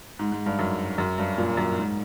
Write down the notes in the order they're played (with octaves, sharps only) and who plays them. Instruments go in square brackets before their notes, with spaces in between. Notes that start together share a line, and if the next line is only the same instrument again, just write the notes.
[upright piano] G#2
G#2
G2
F#2
F#2
G2
A#2
F#2
G#2